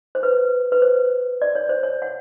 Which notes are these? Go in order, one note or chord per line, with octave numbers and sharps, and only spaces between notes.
C5
B4
B4
C5
D5
C#5
C5
C#5
F#5